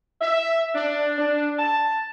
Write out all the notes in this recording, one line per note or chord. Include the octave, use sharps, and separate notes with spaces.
E5
D4
D4
A5